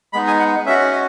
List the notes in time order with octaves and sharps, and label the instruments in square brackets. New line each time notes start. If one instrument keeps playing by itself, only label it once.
[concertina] G#3 B3 D#4 B5
G#5
F#5
C#4 E5
F#4
D#5